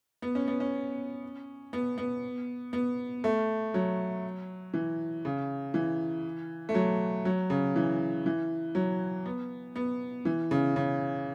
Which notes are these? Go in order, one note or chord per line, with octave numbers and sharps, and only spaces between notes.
B3
C#4
B3
C#4
B3
B3
B3
A3
F#3
E3
C#3
E3
A3
F#3
F#3
C#3
E3
E3
F#3
B3
B3
E3
C#3
C#3